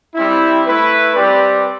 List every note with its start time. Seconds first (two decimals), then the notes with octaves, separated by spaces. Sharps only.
0.15 G3 C4 E4
0.64 A3 E4 B4
1.15 G3 C4 G4 B4 D5